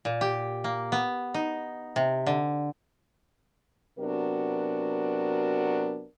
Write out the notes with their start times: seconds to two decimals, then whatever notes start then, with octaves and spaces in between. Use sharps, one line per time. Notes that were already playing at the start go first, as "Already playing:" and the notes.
0.05 A#2
0.21 G4
0.64 A#3
0.92 B3
1.34 D#4
1.96 C3
2.27 D3
3.99 C3 F#3 B3 D4 F#4 A#4